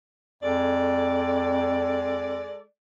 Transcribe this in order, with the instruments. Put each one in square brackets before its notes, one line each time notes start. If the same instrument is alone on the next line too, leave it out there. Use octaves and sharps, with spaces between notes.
[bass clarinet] F2 [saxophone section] G#3 A4 D5